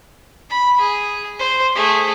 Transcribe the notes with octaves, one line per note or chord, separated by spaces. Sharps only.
B5
G#4
C5
A3 G#4